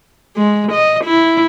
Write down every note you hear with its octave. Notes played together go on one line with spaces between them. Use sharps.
G#3
D#5
E4